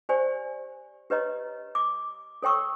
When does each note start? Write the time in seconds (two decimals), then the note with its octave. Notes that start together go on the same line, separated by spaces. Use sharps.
0.09 G4 C5 D5 G#5
1.10 G4 B4 C#5 D#5 A#5
1.75 D6
2.43 A4 C#5 G5 C#6 E6